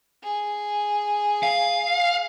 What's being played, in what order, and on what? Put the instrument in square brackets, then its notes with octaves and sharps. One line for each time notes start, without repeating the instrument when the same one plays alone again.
[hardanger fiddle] G#4
[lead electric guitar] F5